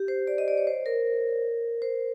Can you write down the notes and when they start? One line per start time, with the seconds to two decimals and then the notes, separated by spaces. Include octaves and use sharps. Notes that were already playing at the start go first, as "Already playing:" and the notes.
Already playing: G4
0.08 C5
0.27 D5
0.38 D#5
0.48 D5
0.57 C#5
0.67 C5
0.86 A#4
1.82 C5